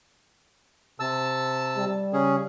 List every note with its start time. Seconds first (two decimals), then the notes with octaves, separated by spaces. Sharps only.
1.00 C3 A5 E6
1.77 G3
2.13 C#3 C#4 G#4